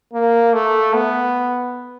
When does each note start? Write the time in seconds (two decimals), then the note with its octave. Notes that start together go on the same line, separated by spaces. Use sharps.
0.13 A#3
0.54 A3
0.94 B3